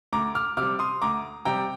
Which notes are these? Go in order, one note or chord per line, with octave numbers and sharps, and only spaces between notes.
D2 A#5 D6
D6 F6
C3 G3 D6 F6
C6 D#6
D2 A#5 D6
C3 G3 G5 A#5